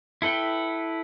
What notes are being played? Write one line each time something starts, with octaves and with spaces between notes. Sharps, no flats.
E4 A4 B4 G5